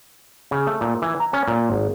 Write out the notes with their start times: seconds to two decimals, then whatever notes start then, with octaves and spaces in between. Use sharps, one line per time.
0.51 C#3
0.67 A3
0.81 A#2
1.02 E3
1.20 A#5
1.33 C#4
1.48 A#2
1.70 G#1